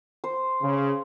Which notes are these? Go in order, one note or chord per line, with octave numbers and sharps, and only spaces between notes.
C5
C#3